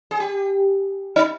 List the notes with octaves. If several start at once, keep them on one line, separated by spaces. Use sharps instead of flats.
G#4
G4
D#4